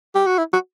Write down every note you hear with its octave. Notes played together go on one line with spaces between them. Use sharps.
G4
F#4
E4
F#4